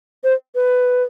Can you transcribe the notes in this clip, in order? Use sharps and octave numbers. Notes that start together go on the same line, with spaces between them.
C5
B4